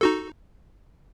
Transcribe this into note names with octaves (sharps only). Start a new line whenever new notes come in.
D#4 F#4 A4